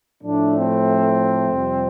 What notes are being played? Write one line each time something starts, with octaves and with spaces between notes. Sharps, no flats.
A2 F3 A3 D4
C4
F2 C3 G3